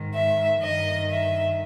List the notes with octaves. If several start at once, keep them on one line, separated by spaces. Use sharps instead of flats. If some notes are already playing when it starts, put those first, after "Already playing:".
Already playing: G#2 D#3
E5
G2 D#3 D#5
E5